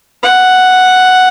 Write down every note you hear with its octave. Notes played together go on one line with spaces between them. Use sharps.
F#5